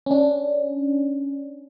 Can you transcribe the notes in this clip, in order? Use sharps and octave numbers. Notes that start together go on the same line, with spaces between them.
C#4 D4